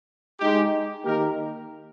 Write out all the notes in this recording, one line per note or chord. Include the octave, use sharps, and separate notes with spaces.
G#3 D#4 G4
D#3 A#3 D#4 G4 A#4